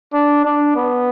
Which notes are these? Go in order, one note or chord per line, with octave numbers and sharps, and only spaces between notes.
D4
D4
B3